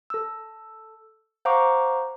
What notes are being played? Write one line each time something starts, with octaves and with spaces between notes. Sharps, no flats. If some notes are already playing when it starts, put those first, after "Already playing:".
A4 E6
C5 F5 F#5 A#5 C#6 D6